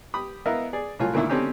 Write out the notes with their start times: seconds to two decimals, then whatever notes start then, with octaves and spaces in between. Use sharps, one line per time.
0.14 G4 B5 D#6
0.46 B3 E4 A#4 D#5 F5
0.73 G#4 D5
0.99 C2 A2 F#3 F4 G#5
1.14 D2 A#2 D#3 A#3 E4
1.30 B2 D3 C4 C#4 D#4 G4